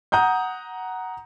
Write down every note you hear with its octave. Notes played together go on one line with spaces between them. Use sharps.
F#5 A#5 D#6 G6